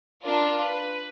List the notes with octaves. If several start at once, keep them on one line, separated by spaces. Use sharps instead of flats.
D4 F4 A#4
B4